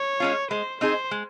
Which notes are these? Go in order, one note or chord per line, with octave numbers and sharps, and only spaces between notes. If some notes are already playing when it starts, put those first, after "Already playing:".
Already playing: C#5
G#3 C#4 F4
G#3 C5
C4 D#4 G#4 C5
G#3